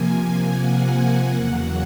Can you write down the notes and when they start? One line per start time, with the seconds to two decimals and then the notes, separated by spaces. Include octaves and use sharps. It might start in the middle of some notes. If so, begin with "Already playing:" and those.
Already playing: C3 F3 A#3 G#5
0.42 F#5
0.87 F#5
1.31 E2 C#3 F#3 A#3